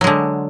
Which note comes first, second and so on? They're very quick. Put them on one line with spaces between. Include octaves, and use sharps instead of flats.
F#3 G#3 D3